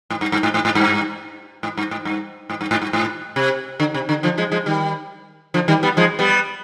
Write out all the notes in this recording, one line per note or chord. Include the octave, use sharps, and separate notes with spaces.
G#2
G2
G2
G#2
G#2
G#2
G2
G#2
G2
G#2
G2
G#2
G2
G#2
G2
G#2
C3
D3
C3
D3
D3 F3
F3 G#3
F3 G#3
D#3 G3
D3 F3
D#3 G3
G3 B3
F3 G#3
G3 B3